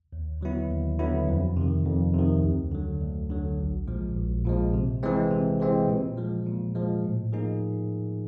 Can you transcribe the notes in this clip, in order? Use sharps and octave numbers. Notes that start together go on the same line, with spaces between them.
D#2
D3 F#3 B3 E4
D#2
D3 F#3 B3 E4
F2
C3 D#3
F2
C3 D#3
D2
D3 F#3
D2
D3 F#3
A#1
A#2 F3 G#3
A#1
A#2 F3 G#3
C3
E3 G#3 C4
C3
E3 G#3 C4
A#2
F3 G#3
A#2
F3 G#3
A2
F3 A#3 D#4 G#4